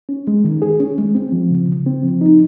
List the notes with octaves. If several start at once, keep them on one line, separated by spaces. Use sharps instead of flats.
C#4
G#3
D#3
G#4
C#4
G#3
C4
F3
C#3
C#3
C4
F3
D#4